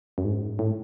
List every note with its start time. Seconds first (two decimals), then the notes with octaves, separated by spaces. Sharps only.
0.18 F#2
0.25 G#2
0.59 A2